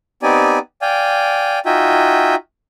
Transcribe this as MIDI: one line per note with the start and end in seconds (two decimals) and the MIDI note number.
0.23 0.59 59
0.23 0.59 60
0.23 0.59 63
0.23 0.59 67
0.23 0.59 74
0.23 0.59 80
0.82 1.59 74
0.82 1.59 77
0.82 1.59 79
0.82 1.59 80
1.66 2.35 63
1.66 2.35 65
1.66 2.35 66
1.66 2.35 76
1.66 2.35 79
1.66 2.35 80